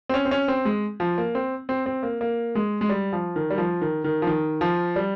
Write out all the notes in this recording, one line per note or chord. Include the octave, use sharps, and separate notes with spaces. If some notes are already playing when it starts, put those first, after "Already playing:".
C4
C#4
C4
C#4
C4
G#3
F3
A#3
C4
C4
C4
A#3
A#3
G#3
G#3
G3
F3
D#3
G3
F3
D#3
D#3
F3
D#3
F3
G3